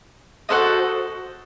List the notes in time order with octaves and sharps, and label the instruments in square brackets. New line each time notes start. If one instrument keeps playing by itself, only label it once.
[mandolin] F#4 A4 C5 D#5